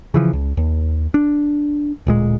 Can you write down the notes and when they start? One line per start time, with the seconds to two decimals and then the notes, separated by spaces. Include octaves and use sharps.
0.14 C#3 E3 F3
0.33 C#2
0.57 D#2
1.14 D4
2.07 D1 A#2 G#3